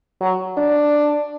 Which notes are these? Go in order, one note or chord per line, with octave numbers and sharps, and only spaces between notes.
F#3
D4